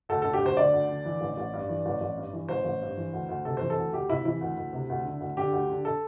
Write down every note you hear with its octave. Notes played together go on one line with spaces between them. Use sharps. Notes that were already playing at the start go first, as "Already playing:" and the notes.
D2 A4
D3 A4
G4
D2 C5
D3 D5
D2
D3
E3
A1
A1
G2
E3
A1
A1
G2
E3
A1 C5
A1
G2
E3
D2
D2
C3 A4
E3 C5
A4
D2
D2 G4
C3 E4
E3 E4
D2
D2
C3
D2
D3
D2
D3 G4
D2
D3
A4